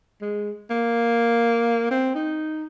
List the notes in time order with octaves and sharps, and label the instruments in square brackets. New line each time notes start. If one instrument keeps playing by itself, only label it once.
[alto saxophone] G#3
A#3
C4
D#4